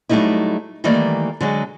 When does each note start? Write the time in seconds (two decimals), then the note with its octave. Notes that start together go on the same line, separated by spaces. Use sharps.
0.09 F#3 G3 A3 A#3 D#4 E4
0.84 D#3 E3 G3 A3 A#3 D5
1.41 D3 F#3 G#3